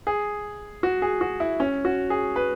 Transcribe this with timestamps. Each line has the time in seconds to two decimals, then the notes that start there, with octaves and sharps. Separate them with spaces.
0.07 G#4
0.83 F#4
1.02 G#4
1.21 F#4
1.40 E4
1.60 C#4
1.85 F#4
2.10 G#4
2.36 B4